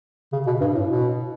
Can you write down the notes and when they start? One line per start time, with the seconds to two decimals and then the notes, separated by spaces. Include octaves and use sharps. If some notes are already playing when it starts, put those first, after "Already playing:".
0.33 C#3
0.47 B2
0.61 G2
0.75 A2
0.89 B2